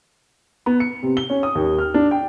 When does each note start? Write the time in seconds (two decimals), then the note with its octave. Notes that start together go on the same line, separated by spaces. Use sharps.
0.66 B3
0.80 C#7
1.03 C3
1.17 G7
1.30 C#4
1.43 D#6
1.55 D#2
1.79 F6
1.94 D4
2.11 G5